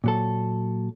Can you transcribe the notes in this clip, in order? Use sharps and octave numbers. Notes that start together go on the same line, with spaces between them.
A#2 F#3 A4